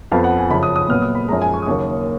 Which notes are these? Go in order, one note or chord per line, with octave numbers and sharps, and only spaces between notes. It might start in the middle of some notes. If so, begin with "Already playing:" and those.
F2 F3 B3 F5
F#5
G#5
F#2 C#3 F3 B5
D#6
D#6
A#2 F#3 B3 F6
D#6
B5
F#2 F3 G#3 A#5
G#5
C#6
D#6
D#2 C#3 F#3 A#3 C#6